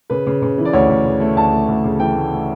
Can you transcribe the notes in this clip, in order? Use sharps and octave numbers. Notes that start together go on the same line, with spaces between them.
C#3 B4
C#3
C#3
E3
D5
D2 C#5
D2
C#3
A3
D2 A5
A3
D2
C#3
E3 G5
A3
A3